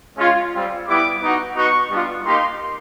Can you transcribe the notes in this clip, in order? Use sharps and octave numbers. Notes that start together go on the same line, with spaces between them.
G#3 C#4 F4
G3 C4 F4
G3 B3 E4 G4 D6
B3 D#4 F#4
B3 D#4 F#4 C#6
G3 B3 D4 F4
A#3 D#4 G4 C6